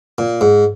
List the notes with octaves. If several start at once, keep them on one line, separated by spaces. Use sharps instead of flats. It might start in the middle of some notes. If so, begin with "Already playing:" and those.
A#2
G#2